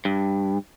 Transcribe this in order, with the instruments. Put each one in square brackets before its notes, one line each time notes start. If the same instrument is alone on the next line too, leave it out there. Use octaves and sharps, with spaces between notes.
[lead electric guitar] G2